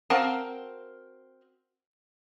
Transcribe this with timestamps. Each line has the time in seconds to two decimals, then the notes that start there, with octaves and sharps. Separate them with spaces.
0.10 C4 F#4 A#4 F5 A5